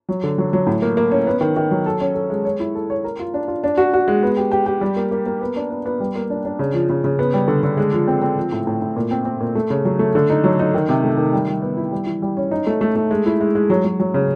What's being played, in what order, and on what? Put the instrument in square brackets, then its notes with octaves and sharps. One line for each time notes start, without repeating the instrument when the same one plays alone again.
[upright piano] F#3
D3
F#3
F#3
A2
A#3
A#3
C#4
B3
D#3
D#3
F#3
A4
C#4
A4
G#3
C#5
E4
A4
C#5
A#4
F4
D4
F4
D4
F#4
F#4
G#3
B3
G4
G4
G4
G3
A#3
A#3
A#3
B3
D4
B3
B3
G3
A#3
D4
D4
C#3
F3
C#3
C#3
B3
G3
D3
D3
G#3
F3
C4
C4
F3
A2
A2
A2
A#2
C4
C4
A#2
A3
C#3
F#3
A3
D3
D#4
F#3
D#4
D#3
C3
A3
D#3
G3
G3
B3
E4
G3
E3
G3
C#4
D#4
A3
A3
A3
G#3
E4
G#3
G#3
F#3
F#3
F#3
C#3